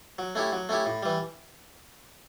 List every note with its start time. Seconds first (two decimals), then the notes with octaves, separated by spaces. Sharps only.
0.19 F#3
0.35 A3 C#4 E4 G4
0.52 F#3
0.69 A3 C#4 E4 G4
0.86 A2
1.03 E3 G3